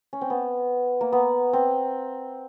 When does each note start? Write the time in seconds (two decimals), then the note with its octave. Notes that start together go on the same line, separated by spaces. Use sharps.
0.13 C#4
0.21 C4
0.30 B3
1.01 A#3
1.12 B3
1.53 C4